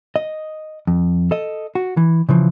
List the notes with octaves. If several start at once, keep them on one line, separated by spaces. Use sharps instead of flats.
D#5
F2
A4 D#5
F#4
E3
C#3 E3 F3